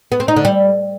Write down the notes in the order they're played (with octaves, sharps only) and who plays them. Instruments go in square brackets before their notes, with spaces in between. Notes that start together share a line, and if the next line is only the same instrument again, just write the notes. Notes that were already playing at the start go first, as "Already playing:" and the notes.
[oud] B3
C4
D#4
D3
G3